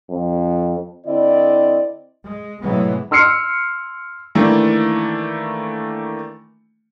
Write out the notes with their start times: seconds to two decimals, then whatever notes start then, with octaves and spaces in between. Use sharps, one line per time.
0.11 F2
1.06 D3 C4 E4 D5 D#5
2.24 G#3
2.61 A2 C3 E3 F#3 G#3 B3
3.11 C6 E6 F6 C7 C#7
4.35 D#3 E3 A3 A#3 D4